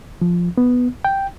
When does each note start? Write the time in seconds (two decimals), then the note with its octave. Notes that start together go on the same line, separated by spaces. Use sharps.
0.21 F3
0.58 B3
1.05 G5